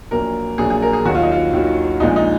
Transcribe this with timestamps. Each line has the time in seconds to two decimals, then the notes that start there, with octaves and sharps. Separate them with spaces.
0.11 A#1 A#2 F#3 A#4
0.58 A#1 A#2 F#3 G#4
0.70 G#4
0.82 A#4
0.93 G#4
1.05 D#2 D#3 F#3 F#4
1.15 F4
1.23 D#4
1.31 F4
1.53 D#2 D#3 F#3
2.00 A#1 A#2 F3 G#3 D#4
2.16 D#4